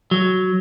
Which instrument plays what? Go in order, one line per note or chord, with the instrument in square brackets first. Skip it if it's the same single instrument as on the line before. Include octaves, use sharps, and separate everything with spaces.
[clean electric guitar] F#3